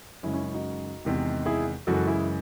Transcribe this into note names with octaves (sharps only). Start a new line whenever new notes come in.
F#2 C#3 G#3 C#4 E4
C#4 E4
C#4 E4
D#4 F#4
E2 C3 D#3 G#3
E4 G#4
F#2 C#3 E3 G#3 F#4 A4
E4 G#4